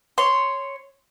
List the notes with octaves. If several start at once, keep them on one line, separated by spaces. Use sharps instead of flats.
C#5 C6